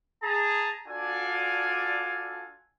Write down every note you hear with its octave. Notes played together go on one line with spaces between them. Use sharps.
G#4 A5 A#5
D4 F4 F#4 A4 D5 G#5